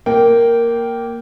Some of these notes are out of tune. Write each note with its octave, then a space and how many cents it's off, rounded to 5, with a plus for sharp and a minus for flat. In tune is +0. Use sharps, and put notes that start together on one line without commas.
A#3 +0 G5 -10